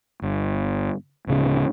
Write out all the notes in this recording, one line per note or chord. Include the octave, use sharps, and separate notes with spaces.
G1
D1 C#3